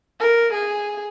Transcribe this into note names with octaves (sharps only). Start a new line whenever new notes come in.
A#4
G#4